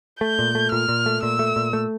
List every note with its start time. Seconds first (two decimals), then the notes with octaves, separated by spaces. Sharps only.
0.21 A3 G6
0.39 A#2
0.55 A3
0.72 A#2 F6
0.88 A#2
1.06 A3
1.23 A#2 E6
1.39 A3
1.56 A#2
1.73 A3